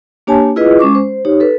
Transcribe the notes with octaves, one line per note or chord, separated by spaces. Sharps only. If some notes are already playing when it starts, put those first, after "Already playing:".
A#3 D4 G4 C#5 G#5 A5
E4 F4 G#4 B4 D#5
G#3 C#4 C#6 D6
C5
D#4 G4 C#5
A4 B4